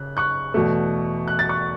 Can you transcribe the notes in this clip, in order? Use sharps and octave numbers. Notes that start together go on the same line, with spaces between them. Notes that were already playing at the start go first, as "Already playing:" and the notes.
Already playing: C#3 F#6
C#6 F#6
E2 B2 A3
F#6
A6
C#6 F#6